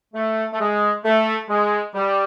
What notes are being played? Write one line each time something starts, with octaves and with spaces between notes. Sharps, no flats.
A3
A3
G#3
A3
G#3
G3